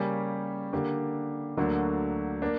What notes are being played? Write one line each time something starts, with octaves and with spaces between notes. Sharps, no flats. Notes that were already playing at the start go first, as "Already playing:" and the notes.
Already playing: C#3 G3 A#3 C#4 G4
D3 A#3 D4 G4
D2 D3 F#3 A#3 D4
A#3 D4